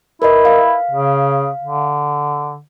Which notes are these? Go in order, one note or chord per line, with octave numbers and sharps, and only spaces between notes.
E4 A#4 B4 D#5
F5
C#3
D3